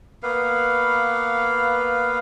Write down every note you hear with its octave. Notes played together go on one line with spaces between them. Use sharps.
A#3 B3 B4 F5